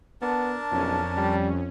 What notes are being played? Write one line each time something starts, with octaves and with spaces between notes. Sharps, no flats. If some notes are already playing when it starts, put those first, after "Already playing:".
B3 D4 A#4 A5
B1 F2 C#4
G3